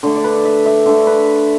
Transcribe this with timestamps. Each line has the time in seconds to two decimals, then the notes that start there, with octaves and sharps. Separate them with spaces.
0.03 D3 A3
0.16 D5
0.24 B4
0.45 E5
0.66 E5
0.86 D3 A3
1.07 B4